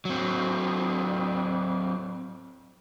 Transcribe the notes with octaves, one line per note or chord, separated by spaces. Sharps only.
F#3 C4